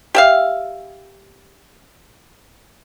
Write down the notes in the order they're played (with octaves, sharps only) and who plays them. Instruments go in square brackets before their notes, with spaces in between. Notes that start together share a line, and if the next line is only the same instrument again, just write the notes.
[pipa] G4 E5 F5